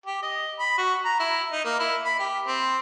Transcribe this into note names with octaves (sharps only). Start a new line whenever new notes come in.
G4
D#5
B5
F#4
A#5
E4
D#4
A#3
E4
B5
G4
C4